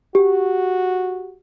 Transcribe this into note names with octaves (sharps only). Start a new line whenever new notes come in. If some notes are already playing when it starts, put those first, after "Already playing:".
F#4 G4